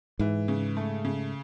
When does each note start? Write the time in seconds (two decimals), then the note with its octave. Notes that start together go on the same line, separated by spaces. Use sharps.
0.19 G#2 E3
0.48 C#3
0.77 A3
1.05 C#3